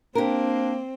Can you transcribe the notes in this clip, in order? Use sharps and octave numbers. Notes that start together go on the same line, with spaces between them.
A#3 C4 D4 G4 A#4